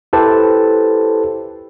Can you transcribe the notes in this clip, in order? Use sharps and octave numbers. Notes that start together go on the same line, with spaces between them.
E4 G4 A4 B4 C5 A5